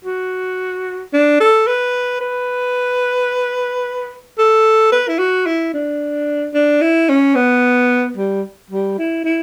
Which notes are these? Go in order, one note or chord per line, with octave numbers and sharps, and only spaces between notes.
F#4
D4
A4
B4
B4
A4
B4
E4
F#4
E4
D4
D4
E4
C#4
B3
G3
G3
E4
E4